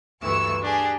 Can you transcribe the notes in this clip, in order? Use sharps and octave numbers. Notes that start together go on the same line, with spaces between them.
D2 G2 E3 C#6 E6
D4 G4 G#4